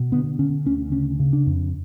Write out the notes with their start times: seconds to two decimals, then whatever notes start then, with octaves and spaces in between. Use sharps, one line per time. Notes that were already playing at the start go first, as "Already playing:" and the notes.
Already playing: B2
0.12 D3 B3
0.39 D3 C#4
0.66 D2 C#4
0.92 C#3 C#4
1.19 C#3
1.33 D4
1.46 F2